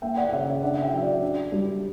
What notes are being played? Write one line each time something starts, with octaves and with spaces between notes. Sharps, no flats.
A#3 E5 G5
D5 F#5
C#3 C#5 E5
C#5 E5
D4 D5 F#5
E5 G5
F#3 E5
D5
D4
G3